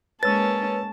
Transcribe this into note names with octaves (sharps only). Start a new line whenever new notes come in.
G#3 A#3 C#4 B4 C#5 A5 E6 A6